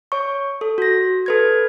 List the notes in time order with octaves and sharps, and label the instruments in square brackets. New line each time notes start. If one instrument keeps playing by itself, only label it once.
[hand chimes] C#5 C#6
A4
F#4 A#6
A4 B4 G#6